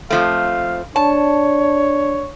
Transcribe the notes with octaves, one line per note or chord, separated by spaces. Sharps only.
F2 F3 A3 F5
D4 C#5 A5